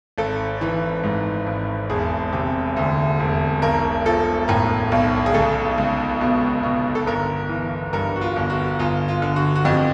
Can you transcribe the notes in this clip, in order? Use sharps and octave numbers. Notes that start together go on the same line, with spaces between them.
G#1 A4
E3
G#2
G#1
E1 G#4
C3
D2
E1
B1 A#4
F3 A4
A2 A#4
B1
G#4
C#2 A4
C#2
B2
B2
A4
G1 A#4
E3
G2 A#4
F#4
F4
G1
F#4
G1 F4
F4
D3
F#4
F#4
F2 G4